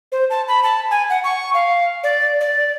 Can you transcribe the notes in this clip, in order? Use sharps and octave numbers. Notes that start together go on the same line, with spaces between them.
C5
A5
B5
A5
G#5
F#5
C#6
F5
D5
D5